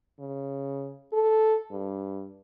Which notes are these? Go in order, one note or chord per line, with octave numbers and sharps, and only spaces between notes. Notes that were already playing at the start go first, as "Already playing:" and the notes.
C#3
A4
G2